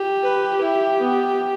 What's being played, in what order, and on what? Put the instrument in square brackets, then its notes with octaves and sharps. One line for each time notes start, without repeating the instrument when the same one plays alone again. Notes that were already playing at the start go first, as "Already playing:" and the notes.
Already playing: [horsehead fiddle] G4
[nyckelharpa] B4
E4
B3